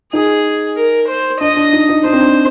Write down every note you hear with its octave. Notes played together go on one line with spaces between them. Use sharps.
D#4 G#4
A#4
C5
D4 D#5
D4
D#4
D#4
D4 C5
C4
D4